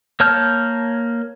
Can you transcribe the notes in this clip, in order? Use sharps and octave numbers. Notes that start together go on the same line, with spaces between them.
A#3 C#5 A5 F6 G6